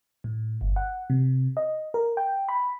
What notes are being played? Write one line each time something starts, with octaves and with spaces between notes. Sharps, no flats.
A2
G1
F#5
C3
D#5
A#4
G5
B5